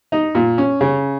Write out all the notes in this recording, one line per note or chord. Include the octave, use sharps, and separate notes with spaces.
D#4
A#2
C#4
C#3